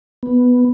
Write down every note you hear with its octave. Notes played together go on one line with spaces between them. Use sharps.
B3